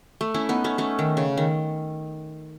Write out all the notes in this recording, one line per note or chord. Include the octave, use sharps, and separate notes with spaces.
A3
C#4 E4
B3 D#4
A3 C#4
A3 C#4
D#3
C#3
D#3